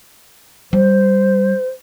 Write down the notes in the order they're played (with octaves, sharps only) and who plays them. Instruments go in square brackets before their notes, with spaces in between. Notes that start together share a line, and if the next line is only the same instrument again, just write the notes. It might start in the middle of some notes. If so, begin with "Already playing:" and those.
[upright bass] G3 [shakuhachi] C5